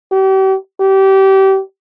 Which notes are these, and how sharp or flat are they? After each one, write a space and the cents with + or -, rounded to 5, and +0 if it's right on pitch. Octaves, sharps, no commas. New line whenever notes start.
G4 -40
G4 -25